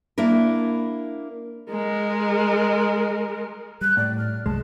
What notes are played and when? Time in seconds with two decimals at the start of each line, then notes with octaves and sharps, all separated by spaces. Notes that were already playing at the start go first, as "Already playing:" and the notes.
0.18 A#3 D4 E4 A#4
1.70 G#3 A#4
3.81 G3 F#6
3.97 A2 D5
4.18 F6
4.46 C2 F#2 G#3 A5